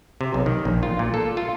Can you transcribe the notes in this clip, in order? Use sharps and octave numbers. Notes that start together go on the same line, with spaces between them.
C3
B1
D#3
A#1
F4
A#2
A4
F4